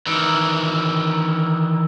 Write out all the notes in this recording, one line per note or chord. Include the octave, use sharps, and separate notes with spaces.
D#3 E3